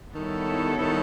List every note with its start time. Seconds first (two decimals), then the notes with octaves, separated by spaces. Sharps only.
0.14 D#3 G3 B3 E4 A4 C#5
0.78 D3
0.82 D#3